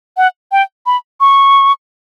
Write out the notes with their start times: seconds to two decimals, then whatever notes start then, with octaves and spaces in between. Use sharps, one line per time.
0.17 F#5
0.52 G5
0.86 B5
1.20 C#6